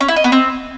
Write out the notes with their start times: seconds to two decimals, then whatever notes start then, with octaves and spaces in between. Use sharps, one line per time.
0.01 C#4
0.08 E4
0.16 D#5
0.24 B3
0.32 C4